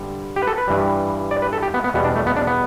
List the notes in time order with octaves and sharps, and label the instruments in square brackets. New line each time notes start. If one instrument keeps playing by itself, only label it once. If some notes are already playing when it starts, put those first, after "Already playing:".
Already playing: [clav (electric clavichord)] G2 D3 G3
G4
B4
A4
B4
G2 E3 G3
D5
B4
A4
G4
B3
B3
E2 B2 G3 B3
D4
A3
B3
D4
B3